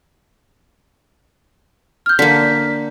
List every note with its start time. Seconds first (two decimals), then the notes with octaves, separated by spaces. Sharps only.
2.06 F6 G6
2.19 D3 A#3 B6